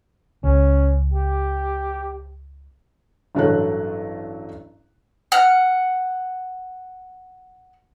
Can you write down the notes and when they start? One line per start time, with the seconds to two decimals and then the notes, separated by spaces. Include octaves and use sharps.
0.44 C#2 C#4
1.13 G4
3.35 A1 G2 F#3 A3 A4 F#6
5.32 F#5 F6